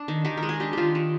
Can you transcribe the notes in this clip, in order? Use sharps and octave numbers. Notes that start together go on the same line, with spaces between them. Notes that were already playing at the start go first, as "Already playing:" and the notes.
Already playing: D4
D#3
D#3 G4
A#4
G#3
G#4
D4 G4
D#3 F4 G4
D#3